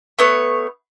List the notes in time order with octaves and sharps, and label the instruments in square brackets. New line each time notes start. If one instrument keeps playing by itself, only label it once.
[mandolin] A3 B3 C#5